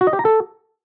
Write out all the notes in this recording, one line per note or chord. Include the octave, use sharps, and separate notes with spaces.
F#4
D#5
G4
A#5
A4